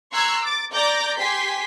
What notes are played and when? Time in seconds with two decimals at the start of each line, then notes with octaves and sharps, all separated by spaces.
0.13 A#5 C6 C#6 E6 F#6 G#6
0.42 D6 A6
0.72 D5 A#5 D6 G6 A#6
1.19 G4 G#5 C6 B6